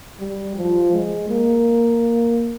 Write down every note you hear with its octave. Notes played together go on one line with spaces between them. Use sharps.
G3
F3
G#3
A#3